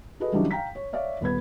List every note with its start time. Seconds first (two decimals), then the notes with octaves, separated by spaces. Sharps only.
0.20 F#4 G#4 A4 B4 D#5
0.32 C#3 E3 F#3 G3 D4 D#4
0.51 F5 G5 A#5 B6
0.75 C#5
0.93 C#5 D5 E5 F5
1.21 D#1 B3 B4 B5 G#6